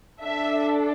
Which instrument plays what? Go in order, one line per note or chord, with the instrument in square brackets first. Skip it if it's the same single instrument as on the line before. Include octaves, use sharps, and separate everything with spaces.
[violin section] D4 A4 E5